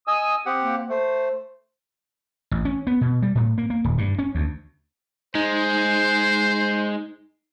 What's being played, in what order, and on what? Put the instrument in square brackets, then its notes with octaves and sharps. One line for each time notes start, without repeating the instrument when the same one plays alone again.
[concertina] D#5 G#5 E6 [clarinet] D#6
[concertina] C4 G4 F#5
[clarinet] A#3
[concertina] A3 [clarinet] C5
[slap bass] A1
C#4
B3
B2
G3
A2
A#3
A#3
D#1
G2
C#4
D2
[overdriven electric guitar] G#3 [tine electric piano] D#4 [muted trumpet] C5